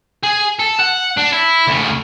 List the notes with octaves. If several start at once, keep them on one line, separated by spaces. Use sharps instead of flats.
G#4
A4
F#5
D4
E4
D2 C#3